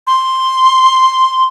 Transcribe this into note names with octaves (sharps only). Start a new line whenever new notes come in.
C6